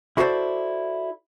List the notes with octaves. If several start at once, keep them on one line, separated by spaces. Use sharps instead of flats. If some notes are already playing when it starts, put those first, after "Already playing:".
E4 F#4 A4 A#4 C5 D5